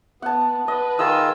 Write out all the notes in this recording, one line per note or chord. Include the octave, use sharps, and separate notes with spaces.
B3 F#5 A5
B4 D#5
D#3 F4 G#4 D#5 E6